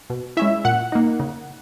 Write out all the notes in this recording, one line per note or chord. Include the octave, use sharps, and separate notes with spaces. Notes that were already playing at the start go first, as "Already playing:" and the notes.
B2
G#3 C#4 E4 E5
A#2 F#5
A#3 D#4
C#3